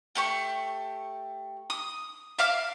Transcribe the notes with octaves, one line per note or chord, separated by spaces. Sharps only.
A3 G4 C#6
D#6
E5 F5 D6 F6